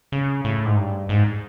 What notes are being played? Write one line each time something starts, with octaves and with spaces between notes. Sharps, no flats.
C#3
A2
G#2
G2
G#2